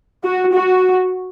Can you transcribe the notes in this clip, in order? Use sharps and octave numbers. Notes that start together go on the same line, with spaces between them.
F#4
F#4